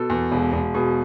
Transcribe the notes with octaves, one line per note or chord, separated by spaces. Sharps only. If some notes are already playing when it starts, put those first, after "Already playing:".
Already playing: B2 A4
E2
E1
E1
B2 G#4